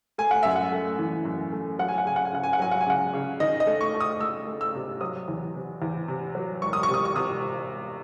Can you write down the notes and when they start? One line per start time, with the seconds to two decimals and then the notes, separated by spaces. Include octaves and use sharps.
0.18 A3 G#5
0.31 F#5
0.43 F#2 E5
0.55 F#5
0.72 A3
0.99 E3
1.25 F#2
1.52 A3
1.79 F#3 F#5
1.88 G#5
1.98 F#5
2.06 C#3 G#5
2.16 F#5
2.25 G#5
2.33 C#3 F#5
2.43 G#5
2.53 F#5
2.60 F#3 G#5
2.71 F#5
2.81 G#5
2.86 C#3 F#5
3.14 C#3
3.40 D#3 D#5
3.60 D#5
3.67 A3
3.81 C#6
3.94 A3
4.00 D#6
4.20 A3 E6
4.47 A3
4.61 E6
4.74 C3
5.01 F#3 D#6
5.28 E2
5.55 C3
5.82 E2
6.08 C3
6.35 F#3
6.62 E1 C#6
6.73 D#6
6.83 C#6
6.88 C3
6.94 D#6
7.05 C#6
7.15 C3 D#6